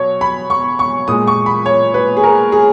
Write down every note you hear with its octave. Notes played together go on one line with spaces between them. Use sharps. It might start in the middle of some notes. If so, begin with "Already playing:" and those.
Already playing: B2 F#3 C#5
B5
C#6
C#6
A#2 G#3 D#6
C#6
B5
C#5
B4
G#4
A#4
G#4